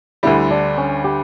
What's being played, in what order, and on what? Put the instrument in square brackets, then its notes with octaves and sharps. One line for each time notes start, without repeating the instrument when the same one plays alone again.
[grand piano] D2 D3 G3 [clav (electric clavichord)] E4
[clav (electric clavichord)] D4
C#4
G4